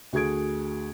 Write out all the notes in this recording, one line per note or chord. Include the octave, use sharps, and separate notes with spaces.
D2 F#4 G#4 G#6 D7